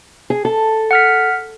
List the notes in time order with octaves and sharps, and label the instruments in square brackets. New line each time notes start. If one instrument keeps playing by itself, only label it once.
[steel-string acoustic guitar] G#4
A4
[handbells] F#5 F6 B6